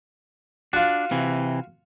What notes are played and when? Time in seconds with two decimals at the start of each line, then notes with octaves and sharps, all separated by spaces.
0.73 D4 F4 F#4
1.11 C3 E3